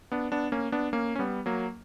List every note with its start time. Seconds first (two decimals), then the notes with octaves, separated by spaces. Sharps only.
0.12 B3 D4
0.32 B3 D4
0.52 A#3 C#4
0.72 B3 D4
0.93 A#3 C#4
1.16 C#4
1.19 G3 B3
1.46 F#3 A#3